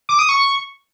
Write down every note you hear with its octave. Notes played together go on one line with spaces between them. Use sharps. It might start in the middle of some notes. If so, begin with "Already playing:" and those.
D6
D#6
C#6